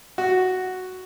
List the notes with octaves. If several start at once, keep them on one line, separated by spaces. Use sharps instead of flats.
F#4